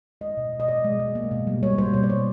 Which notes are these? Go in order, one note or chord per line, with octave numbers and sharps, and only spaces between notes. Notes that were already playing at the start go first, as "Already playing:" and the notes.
G#3 D#5
B2
B2
D#5
B2 D5
G#3
G#3
A#3
B2
G3
A#3 C#5
G3 C5
B2 C#5
D5
G3 C#5